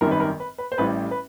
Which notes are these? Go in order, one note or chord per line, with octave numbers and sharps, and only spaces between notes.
G#1 F#2 D#3 G3 A#4
B4
A#4
B4
B4
C5
A1 A2 E3 G3 B4
B4